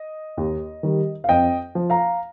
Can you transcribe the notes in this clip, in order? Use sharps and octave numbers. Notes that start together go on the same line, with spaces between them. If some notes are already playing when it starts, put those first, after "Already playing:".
Already playing: D#5
D#2
D#3 G3
F5
F2 D#5 G5
F3
F5 A#5